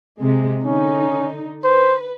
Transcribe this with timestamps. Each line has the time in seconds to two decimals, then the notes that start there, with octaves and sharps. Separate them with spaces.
0.20 C3 G#3
0.63 D3 C#4 D#4
1.64 B4 C5